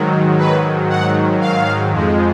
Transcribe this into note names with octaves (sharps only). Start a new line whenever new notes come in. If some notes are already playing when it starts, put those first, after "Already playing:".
Already playing: G#2 D#3 F#3
B4
F#5
F5
F2 F3 G#3